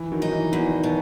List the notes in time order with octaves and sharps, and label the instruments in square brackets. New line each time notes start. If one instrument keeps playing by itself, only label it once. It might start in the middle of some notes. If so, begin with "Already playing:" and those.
Already playing: [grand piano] E3
D#3 F#3
[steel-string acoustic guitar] D#4
[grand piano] E3
[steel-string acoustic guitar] E2 [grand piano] E3
[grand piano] D#3
[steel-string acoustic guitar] B2